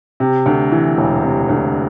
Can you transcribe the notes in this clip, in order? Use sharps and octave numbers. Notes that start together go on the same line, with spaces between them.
C3
D2
E3
E1
C3
D2